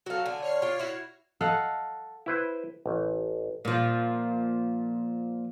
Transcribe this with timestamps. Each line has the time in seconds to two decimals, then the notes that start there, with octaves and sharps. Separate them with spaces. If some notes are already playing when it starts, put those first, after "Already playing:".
0.06 F#3 F#4 A4 F5
0.26 D3 G#5
0.42 C#5 F6 C7
0.62 F4 G4
0.79 E4 F#4
1.41 A4 D#5 F5 F#5
2.26 E4 B4 C5
2.86 A1
3.65 A#2 F3